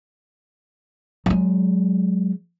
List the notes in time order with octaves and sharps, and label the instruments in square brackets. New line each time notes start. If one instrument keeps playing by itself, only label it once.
[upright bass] F#3 G#3